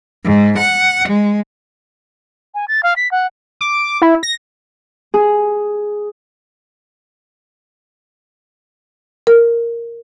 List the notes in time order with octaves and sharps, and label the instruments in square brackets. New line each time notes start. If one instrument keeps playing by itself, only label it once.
[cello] G#2
F#5
G#3
[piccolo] G#5
A6
F5
B6
F#5
[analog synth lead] D6
E4
A#6
[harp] G#4
[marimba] A#4